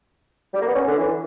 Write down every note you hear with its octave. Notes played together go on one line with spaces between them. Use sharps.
G3
A#3
B3
C#4
D3
E3